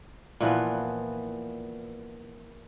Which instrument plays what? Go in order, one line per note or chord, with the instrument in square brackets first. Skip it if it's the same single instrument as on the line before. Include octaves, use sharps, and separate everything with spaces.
[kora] A#2 E3 F3 B3